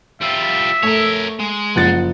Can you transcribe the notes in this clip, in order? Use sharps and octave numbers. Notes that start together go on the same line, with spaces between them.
G3 F4 E5
A3 A#4 C#5
G#3
F#1 F3 F#5 A6